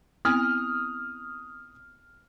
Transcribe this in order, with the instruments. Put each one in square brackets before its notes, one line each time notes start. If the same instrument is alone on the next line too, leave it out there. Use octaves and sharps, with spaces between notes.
[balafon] B3 C4 E4 [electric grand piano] D#6 F6